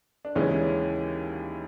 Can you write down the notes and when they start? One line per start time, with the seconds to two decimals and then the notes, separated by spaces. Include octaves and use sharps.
0.25 D4
0.35 D#2 C#3 E3 G#3 C#4